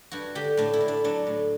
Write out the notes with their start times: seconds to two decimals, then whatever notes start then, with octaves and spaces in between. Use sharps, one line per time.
0.11 G2 F#4
0.35 D3 G4
0.57 A2 D4
0.73 E4
0.81 A2
0.88 D4
1.04 F#3 D4
1.27 A2